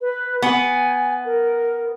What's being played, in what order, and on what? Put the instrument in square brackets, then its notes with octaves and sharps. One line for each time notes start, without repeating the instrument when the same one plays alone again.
[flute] B4
[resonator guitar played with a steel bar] B3 [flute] G#5
[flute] A#4